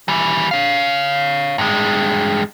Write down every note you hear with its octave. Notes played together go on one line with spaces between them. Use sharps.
E3 G3
C#5 F5
G2 G#3